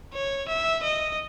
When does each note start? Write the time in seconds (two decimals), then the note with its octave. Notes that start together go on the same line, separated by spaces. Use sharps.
0.13 C#5
0.48 E5
0.83 D#5